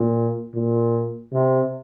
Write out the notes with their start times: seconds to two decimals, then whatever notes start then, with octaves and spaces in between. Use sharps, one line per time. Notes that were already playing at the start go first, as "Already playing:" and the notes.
Already playing: A#2
0.55 A#2
1.33 C3